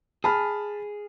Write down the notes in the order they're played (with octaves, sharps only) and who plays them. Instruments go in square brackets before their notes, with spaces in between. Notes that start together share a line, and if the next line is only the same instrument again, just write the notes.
[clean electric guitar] G#4 [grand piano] A5 B5 F6